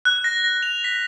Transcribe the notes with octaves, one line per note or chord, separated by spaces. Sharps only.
F#6
A#6
A#6
F7
B6